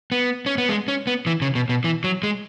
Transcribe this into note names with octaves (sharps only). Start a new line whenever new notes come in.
B3
C#4
B3
G#3
C#4
B3
E3
C#3
B2
B2
E3
F#3
G#3